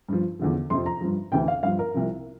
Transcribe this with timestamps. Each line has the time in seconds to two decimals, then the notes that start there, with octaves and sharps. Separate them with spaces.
0.09 G2 F3
0.39 E2 D3 F3
0.70 F2 C3 F3 C6
0.86 A#5
1.01 G2 F3
1.32 D2 C3 E3 G5
1.48 F5
1.63 G2 F3 F5
1.79 A#4
1.94 C2 C3 F3